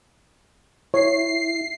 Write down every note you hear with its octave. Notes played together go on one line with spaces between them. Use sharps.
E4 C#5 C7